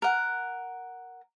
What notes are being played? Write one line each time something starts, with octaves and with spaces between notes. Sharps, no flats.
A#4 F#5